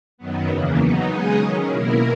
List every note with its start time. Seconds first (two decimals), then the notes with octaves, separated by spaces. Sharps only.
0.18 F#2 D#3 F#3 B3
0.48 E2 C#3 E3 A#3
0.77 F#3 B3 D#4
1.07 C#3 G#3 D#4 G#4 D#5
1.36 D#3 F#3 C#4
1.66 B2 A#3 E4 A#4